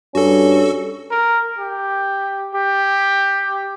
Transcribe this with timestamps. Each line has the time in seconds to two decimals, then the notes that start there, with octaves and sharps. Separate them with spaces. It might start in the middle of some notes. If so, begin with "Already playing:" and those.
0.15 G2 C#4 F#4 A4
1.11 A#4
1.58 G4
2.54 G4